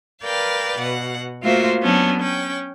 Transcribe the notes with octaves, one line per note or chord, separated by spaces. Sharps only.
A#4 B4 D5 F5 G5
B2 F#5
A3 A#3 F4 F#4 C5 E5
F#3 B3 C#4 D4
C#4 G5